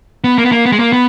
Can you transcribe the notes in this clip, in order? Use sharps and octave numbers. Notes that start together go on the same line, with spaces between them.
B3
A#3
B3
A#3
B3
G#3
A#3
B3